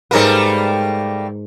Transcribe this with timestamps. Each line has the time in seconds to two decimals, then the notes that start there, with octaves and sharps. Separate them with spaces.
0.11 G#2 G3 A3 A#3 A#4 B4